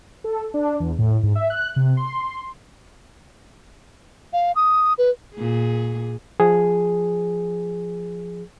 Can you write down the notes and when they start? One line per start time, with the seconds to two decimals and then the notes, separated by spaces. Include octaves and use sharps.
0.24 A4
0.54 D4
0.80 E2
0.99 A2
1.23 G#2
1.35 E5
1.50 F#6
1.76 C3
1.97 C6
4.33 F5
4.56 D#6
4.98 B4
5.36 A#2 G#4
6.40 F3 G#4